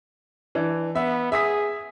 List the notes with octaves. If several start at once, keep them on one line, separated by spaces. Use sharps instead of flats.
E3 D4
B3 E5
G#4 E5 D#6 B6